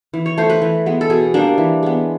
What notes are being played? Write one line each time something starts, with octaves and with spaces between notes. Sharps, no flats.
E3
C#5
A3 C5
B4
E3
G#3 B3
A4
B2 G#4
G3 A#3 D4
E3
G#3 B3